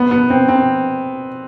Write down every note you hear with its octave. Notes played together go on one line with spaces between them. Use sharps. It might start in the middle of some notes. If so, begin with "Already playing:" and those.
Already playing: B3
B3
C4
C4